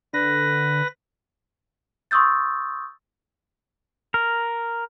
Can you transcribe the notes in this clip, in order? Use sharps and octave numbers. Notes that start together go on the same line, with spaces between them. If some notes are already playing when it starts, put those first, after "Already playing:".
D3 B4 A#6
C6 C#6 D#6 E6 G6 A6
A#4